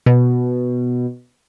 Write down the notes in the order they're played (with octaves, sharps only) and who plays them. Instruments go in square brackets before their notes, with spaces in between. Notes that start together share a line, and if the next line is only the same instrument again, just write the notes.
[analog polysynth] B2